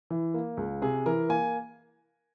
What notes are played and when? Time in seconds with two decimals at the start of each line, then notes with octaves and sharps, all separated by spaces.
0.10 E3
0.34 A#3
0.57 C#2
0.82 C3 G#4
1.06 E3 A#4
1.29 A#3 G#5